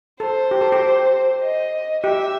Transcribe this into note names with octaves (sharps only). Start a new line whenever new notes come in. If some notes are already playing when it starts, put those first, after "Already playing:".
A4 C5
G4
A4
G4
D#5
G4 E5